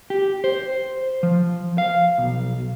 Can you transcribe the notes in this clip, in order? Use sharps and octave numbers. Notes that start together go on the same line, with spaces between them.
G4
C5
F3
F5
B1